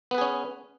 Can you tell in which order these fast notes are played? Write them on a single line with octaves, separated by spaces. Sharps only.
B3 B4 G#4 C#4